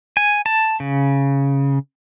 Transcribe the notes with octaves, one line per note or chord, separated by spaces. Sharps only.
G#5
A5
C#3